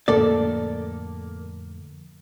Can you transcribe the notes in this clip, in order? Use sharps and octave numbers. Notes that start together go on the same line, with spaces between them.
F2 A2 D3 A#3 A4 D5